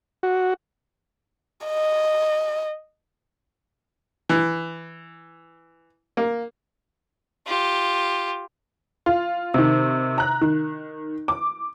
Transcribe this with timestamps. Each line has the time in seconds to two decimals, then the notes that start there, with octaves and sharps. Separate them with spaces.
0.23 F#4
1.67 D#5
4.29 E3
6.17 A#3
7.47 F4 G4
9.06 F4
9.54 C3 D#3
10.18 A#5 F#6
10.41 D#3
11.28 D6